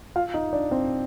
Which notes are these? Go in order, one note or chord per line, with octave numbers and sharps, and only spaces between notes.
F4 F5
D#4 D#5
D4 D5
C4 C5